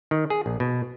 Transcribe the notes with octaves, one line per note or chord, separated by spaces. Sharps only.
D#3
G#4
A#1
B2